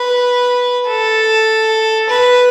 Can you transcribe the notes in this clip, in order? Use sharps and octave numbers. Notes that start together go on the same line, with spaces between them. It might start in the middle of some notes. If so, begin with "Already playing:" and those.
Already playing: B4
A4
B4